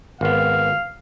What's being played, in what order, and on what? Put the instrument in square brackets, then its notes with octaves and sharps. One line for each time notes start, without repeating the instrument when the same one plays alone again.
[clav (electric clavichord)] G#1 B3 [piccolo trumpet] F5